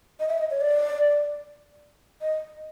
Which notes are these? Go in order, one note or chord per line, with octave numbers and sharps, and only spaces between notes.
D#5
E5
D#5
C#5
D5
D#5